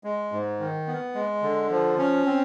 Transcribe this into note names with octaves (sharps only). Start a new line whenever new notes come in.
G#3
G#2
D#3
B3
G#3
D3
F3
C#4
C4